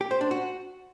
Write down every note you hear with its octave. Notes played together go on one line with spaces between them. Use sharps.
G4
C5
D4
F#4